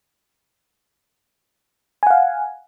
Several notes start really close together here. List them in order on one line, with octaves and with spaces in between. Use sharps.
G#5 F#5 F5